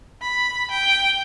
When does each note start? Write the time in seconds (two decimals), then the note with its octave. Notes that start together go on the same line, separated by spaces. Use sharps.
0.22 B5
0.71 G5